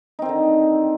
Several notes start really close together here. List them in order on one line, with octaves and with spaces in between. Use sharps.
D#4 C4 D#3 D3